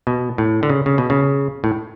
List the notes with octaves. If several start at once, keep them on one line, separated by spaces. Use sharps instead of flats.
B2
A2
D3
C#3
C#3
B2
C#3
A2